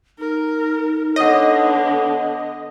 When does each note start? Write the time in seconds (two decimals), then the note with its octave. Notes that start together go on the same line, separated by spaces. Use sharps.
0.19 D#4 A#4
1.16 D3 B3 C#5 D#5 F#5